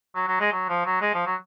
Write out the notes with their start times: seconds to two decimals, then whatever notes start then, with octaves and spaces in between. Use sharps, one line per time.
0.15 F#3
0.28 F#3
0.40 G#3
0.52 F#3
0.69 F3
0.85 F#3
1.01 G#3
1.14 F3
1.26 F#3